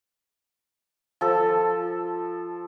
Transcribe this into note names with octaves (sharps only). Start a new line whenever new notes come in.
F3 A4